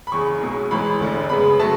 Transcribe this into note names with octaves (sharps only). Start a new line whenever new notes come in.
B5
F#1 E2 C#3 C#6
B1 B2 G#3
A1 G#2 E3 B5
E1 D2 D3
F#2 C#3 G#3 B3 B5
C#3 F#3 A3 A5